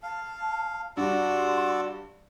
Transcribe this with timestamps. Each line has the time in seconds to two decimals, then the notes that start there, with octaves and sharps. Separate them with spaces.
0.03 F5 A5
0.97 G2 F#4 D5 C6 E6